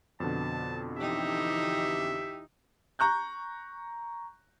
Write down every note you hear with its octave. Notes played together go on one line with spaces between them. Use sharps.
F2 B2 D3 A5
E3 D#4 G4 E5
A#5 C#6 F#6 G6